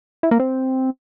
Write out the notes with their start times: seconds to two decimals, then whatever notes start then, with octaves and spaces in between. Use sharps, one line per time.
0.23 E4
0.31 A#3
0.40 C4